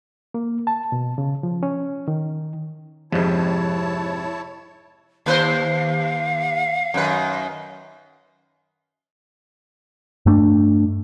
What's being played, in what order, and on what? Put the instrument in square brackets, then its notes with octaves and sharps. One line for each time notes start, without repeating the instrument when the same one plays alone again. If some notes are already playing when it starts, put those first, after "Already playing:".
[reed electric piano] A#3
A5
B2
C#3
F3
C#4
D#3
[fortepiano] F2 [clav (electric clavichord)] G#2 C3 [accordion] E4 C#5 A5
[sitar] D#2 B4 C5 [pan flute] F5
[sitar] F#2 D#3 B4
[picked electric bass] G2 A3 D4